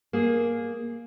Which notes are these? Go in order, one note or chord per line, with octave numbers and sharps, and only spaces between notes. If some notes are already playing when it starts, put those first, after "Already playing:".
A#3 G#4